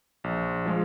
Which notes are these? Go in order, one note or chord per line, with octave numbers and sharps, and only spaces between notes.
A#1
F3 G#3